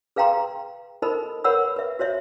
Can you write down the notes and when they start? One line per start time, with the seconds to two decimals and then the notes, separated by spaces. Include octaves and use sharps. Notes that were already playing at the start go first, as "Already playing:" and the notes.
0.16 G#4 B4 F5 G5 A#5 C6
1.02 D#4 A4 A#4 C5 D#5 B5
1.44 A#4 B4 C#5 F#5 B5 E6
1.76 B4 E5
1.99 F#4 C5 C#5 E5